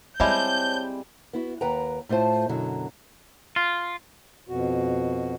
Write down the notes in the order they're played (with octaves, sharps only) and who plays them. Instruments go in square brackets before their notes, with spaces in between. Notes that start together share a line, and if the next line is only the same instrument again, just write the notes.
[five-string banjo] G3 G#3 E4 [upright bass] C4 [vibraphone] C5 C#5 A5 [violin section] G6
[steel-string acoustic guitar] B3 E4 F#4
D#2 B4 F#5 G5 A#5
A2 A3 F4 C5 A5
F#2 B2 D3 F#3
[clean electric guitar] F4
[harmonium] F2 B2 F#4